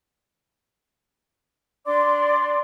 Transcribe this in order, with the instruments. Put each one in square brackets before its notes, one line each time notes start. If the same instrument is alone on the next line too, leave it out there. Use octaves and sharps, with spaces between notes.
[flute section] D4 D5 C6 D6